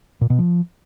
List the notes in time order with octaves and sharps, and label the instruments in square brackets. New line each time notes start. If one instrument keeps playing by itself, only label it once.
[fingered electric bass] A#2
B2
F3